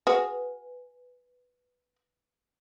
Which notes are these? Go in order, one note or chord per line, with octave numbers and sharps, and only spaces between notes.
F#4 G#4 B4